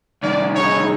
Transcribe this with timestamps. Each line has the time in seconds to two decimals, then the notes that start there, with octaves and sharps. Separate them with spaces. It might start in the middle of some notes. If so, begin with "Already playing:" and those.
0.23 C2 D#3 D5
0.55 D#4 E4 G#4 C#5